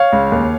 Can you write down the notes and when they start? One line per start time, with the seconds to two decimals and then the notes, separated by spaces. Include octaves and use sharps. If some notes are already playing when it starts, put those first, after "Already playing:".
Already playing: C#5 F5
0.12 C#2
0.32 D#2